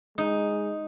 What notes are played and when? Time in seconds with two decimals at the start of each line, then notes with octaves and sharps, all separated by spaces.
0.18 G#3 D#4